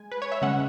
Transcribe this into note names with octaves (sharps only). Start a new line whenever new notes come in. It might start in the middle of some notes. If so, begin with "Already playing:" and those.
Already playing: G#3 G#5
B4
C#5
E5
C#3 G#3 C#4 F#5